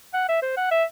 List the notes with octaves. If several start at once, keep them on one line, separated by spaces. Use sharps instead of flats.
F#5
E5
C5
F#5
E5